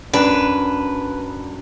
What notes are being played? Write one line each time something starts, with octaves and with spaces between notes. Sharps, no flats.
F#2 D4 B4